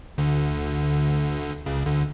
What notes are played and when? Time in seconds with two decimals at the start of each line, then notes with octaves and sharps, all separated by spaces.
0.18 D2 D3
1.66 C#2 C#3
1.86 D2 D3